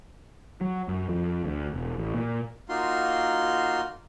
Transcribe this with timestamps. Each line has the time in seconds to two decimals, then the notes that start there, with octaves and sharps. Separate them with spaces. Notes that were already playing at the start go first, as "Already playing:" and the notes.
0.61 F#3
0.88 F#2
1.09 F2
1.44 D2
1.74 E1
1.98 A1
2.14 A#2
2.69 A#3 D#4 F4 F#4 C6